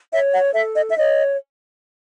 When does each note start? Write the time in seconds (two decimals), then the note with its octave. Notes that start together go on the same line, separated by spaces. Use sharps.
0.12 C#5 E5
0.33 F#5
0.54 A4 E5
0.76 D#5
0.90 E5
0.97 C#5 D#5